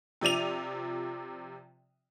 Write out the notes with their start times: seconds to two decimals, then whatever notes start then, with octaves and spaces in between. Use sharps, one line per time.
0.21 C3 F3 D5 D#7 F7